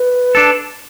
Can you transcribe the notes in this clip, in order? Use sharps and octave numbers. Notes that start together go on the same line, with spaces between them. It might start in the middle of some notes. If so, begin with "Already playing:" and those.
Already playing: B4
D4 A4